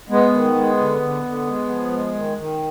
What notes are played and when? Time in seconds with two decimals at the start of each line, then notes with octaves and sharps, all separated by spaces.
0.09 G#3 B3
0.33 D#3
0.55 G#3
0.77 D3
1.01 D3
1.24 D3
1.47 G#3
1.69 F3
1.91 G#3
2.14 D#3
2.37 D#3